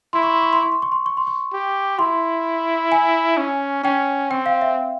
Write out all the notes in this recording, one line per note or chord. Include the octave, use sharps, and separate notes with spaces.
E4 C6
C#6
C6
C#6
C6
C#6
C6
C#6
C6
C#6
C6
C#6
G4
E4 C6
G#5
C#4
C#4 G5
C4 G5
F5
E5